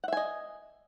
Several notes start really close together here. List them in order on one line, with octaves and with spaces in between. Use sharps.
F#5 E5 G#5 D#5